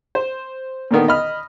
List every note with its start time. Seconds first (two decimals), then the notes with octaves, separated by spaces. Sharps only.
0.15 C5
0.91 A#2 D3 D#3 B3
1.08 D#5 B5 F6